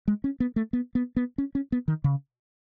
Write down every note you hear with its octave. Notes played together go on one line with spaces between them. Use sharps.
G#3
C#4
B3
A3
B3
B3
B3
C#4
C#4
B3
D#3
C#3